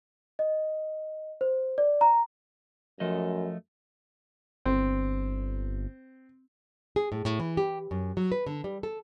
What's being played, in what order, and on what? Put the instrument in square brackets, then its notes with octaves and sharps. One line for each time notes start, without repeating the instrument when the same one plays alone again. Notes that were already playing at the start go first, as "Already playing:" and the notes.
[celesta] D#5
C5
D5
A#5
[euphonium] F#2 [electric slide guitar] F3 A3 D#5
[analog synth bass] G1 [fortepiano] C4
[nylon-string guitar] G#4
A2
A2
E3
G4
F#2
F#3
B4
D3
G3
A4